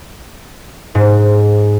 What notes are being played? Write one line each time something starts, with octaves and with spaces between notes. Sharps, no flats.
G#2